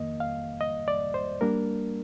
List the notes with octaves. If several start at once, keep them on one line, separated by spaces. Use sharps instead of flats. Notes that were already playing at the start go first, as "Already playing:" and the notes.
Already playing: F2 D#3 A#3 D#5
F5
D#5
D5
C5
G3 A#3 D4 A#4